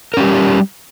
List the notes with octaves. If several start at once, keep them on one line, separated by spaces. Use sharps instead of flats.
G3 C#4 G4 A#4